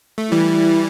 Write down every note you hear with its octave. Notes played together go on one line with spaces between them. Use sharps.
A3
E3 G3 E4